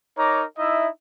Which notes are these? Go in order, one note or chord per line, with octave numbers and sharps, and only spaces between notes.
D#4 A#4 C#5 A#5 D6
D#4 E4 D#5 E5